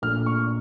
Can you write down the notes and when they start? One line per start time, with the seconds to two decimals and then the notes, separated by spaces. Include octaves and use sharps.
0.02 A#1 A#2 A3 F6
0.26 C#6